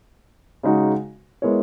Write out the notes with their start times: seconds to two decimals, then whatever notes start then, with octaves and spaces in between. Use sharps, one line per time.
0.63 C#3 G#3 D#4 F#4
1.42 G#3 B3 E4 A#4 C#5